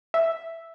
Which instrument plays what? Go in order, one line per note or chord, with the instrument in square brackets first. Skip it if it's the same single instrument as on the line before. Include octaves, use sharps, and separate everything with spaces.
[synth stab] E5